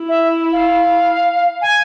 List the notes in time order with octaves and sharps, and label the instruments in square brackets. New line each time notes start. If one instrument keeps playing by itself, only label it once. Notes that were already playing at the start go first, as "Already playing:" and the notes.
Already playing: [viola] E4
[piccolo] E5
F5
G#5